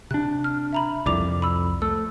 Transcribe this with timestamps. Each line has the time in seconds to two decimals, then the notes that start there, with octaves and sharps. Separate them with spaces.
0.11 C3 D4 F#6
0.44 F6
0.73 E5 A#5 B5
1.06 C2 F2 D5 D6 F7
1.42 B5 E6
1.82 A3 E6